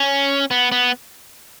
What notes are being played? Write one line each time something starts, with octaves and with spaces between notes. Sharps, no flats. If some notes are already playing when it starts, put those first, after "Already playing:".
Already playing: C#4
B3
B3